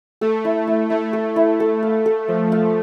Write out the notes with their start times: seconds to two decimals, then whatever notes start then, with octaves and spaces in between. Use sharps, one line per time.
0.21 A3 A4
0.45 E4
0.67 E4
0.90 A3 E4
1.13 A4
1.36 E4
1.60 A4
1.83 F5
2.06 A4
2.28 F3 C5
2.52 F5